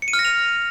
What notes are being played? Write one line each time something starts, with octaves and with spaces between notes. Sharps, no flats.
C#7
D#7
F6
A#6
F7